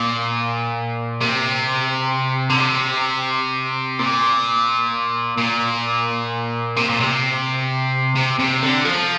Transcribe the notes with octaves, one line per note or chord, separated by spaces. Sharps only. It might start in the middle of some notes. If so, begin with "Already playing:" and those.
Already playing: A#2
C3
D3
C3
A#2
A#2
C3
A#2
C3
C3
C3
D3
F3